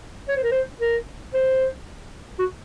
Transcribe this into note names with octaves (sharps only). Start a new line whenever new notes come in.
C#5
C5
A#4
C5
A#4
C5
F#4